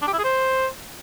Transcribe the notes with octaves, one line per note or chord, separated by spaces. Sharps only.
D4
G4
E4
G#4
C5